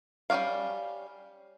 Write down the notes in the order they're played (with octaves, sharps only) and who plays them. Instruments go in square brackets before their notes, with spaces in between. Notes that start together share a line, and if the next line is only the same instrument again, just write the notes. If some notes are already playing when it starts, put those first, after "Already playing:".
[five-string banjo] G3 C#4 F#4 D5 F5